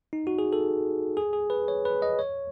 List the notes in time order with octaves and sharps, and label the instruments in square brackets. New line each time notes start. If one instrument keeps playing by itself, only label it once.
[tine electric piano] D#4
F#4
G#4
A4
G#4
G#4
B4
C#5
B4
D#5
C#5